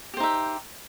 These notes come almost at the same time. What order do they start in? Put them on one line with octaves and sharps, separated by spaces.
G4 C5 D#4 E5